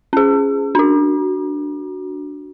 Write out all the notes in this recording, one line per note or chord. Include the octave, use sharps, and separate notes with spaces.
C#4 G#4
D4 F#4